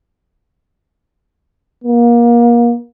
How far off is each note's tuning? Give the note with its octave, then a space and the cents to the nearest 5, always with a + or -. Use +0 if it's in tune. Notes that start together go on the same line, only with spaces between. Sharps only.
A#3 +30